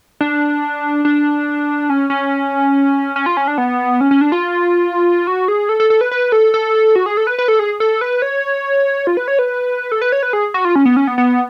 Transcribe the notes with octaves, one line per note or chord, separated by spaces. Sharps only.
D4
D4
C#4
C#4
C#4
F4
C#4
D4
B3
C#4
C#4
D4
F4
F#4
G#4
A4
A4
A4
B4
B4
A4
A4
F#4
G#4
A4
B4
B4
A4
G#4
A4
B4
C#5
F4
B4
C#5
B4
A4
B4
C#5
B4
G#4
F#4
F4
C#4
B3
C#4
B3
B3